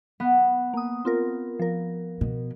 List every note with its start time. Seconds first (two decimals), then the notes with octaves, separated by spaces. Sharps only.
0.20 B3
0.74 A#3 D#6
1.05 C4 F4 A#4
1.59 F3 A#4
2.21 B2